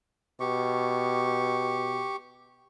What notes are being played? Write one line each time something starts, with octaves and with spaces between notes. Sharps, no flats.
B2 G4 C#6